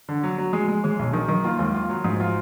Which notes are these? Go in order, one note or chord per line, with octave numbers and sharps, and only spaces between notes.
D3
F#3
F#3
F3 G#3
G#3
D#3 G#3
B1
D#3 F3
D#3 F#3
A#3 F4
D#2 G#3
F4
F#3
G#2 F3
F4